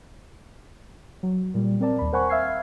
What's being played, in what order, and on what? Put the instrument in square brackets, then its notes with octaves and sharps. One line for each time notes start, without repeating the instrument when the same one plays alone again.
[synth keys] F#3
A#2 G3
C4 A#4 D5 A5
D#2 B5
A#4 C5 F#5 G#5 B5 C#6
E5 F5 E6 F6 G#6 C7